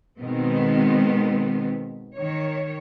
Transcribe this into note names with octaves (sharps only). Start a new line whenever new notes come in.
B2 D#3 G#3 B3 C4
D#3 C#5